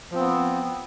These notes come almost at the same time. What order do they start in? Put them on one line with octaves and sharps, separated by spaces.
F3 C4 B3